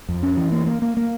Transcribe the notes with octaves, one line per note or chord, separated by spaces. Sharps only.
F2
C#4
E3
A#3
A#3
A#3
A#3